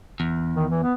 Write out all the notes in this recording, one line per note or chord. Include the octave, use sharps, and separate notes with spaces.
E2
D#3
E3
B3